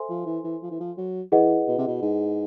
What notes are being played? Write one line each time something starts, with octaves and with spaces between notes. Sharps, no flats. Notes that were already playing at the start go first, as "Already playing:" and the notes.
Already playing: A4 C5 E5 G#5 C6
F3
E3
E3
F3
E3
F3
F#3
E3 E4 G#4 B4 D#5 F#5
B2
C3
B2
G#2